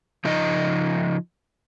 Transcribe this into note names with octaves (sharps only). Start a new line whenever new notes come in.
C#3 F3 D#4 D#5